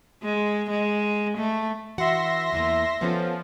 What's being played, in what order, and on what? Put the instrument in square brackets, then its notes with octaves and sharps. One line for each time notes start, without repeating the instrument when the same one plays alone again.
[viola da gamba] G#3
G#3
A3
[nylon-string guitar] E3 F#4 F#5 [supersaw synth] E5 C6 A#6
[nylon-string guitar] E2 E3 A#3
[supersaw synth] F3 [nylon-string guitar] B3 C#4 A4